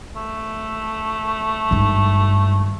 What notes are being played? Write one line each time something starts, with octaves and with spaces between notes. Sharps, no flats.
A3
G#1 G2